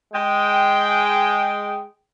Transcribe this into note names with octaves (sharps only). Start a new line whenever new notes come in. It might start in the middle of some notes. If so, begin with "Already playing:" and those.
G#3 G5